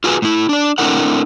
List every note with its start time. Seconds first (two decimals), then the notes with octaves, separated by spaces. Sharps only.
0.04 F4 F#4 G#4 B4
0.22 A2 E4
0.49 D4 D5
0.78 A3 C4 D4 E4 A#4 F#5